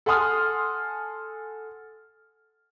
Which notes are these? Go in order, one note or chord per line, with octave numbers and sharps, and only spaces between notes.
A4 F#5 G#5 C6 D#6 F6